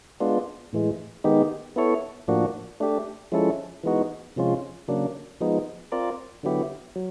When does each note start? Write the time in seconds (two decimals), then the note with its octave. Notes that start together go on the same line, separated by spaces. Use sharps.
0.20 G#3 B3 D4 F4
0.73 A2 E3 G#3
1.24 D#3 G#3 B3 D#4 G4
1.76 B3 E4 A4 C#5
2.28 A2 F3 A#3 D4 F#4
2.80 A3 D4 G4
3.32 F3 G#3 C#4 E4 A4
3.84 E3 G#3 B3 D#4 F#4
4.36 C3 F3 G#3 C#4 F4
4.88 C#3 F#3 A#3 D4
5.40 F3 G#3 B3 D#4
5.92 C4 F4 A#4 D5
6.43 D3 F#3 B3 E4 G4
6.96 F#3